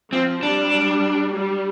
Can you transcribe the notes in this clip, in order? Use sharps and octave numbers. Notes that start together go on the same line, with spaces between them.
F3 C4
G3 D4
G3